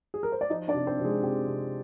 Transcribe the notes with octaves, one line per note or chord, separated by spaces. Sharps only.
G#4
A#4
C5
D5
F3 D#4 D#5
D4 D5
C3
C4 C5
C3
G#3 G#4
C3 G4
C3